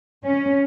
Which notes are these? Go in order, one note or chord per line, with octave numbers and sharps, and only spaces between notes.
C#4